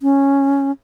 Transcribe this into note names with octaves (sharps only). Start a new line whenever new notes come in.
C#4